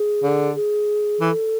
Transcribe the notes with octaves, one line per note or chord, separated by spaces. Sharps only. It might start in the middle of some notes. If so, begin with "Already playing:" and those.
Already playing: G#4
D3
G#4
E3 A4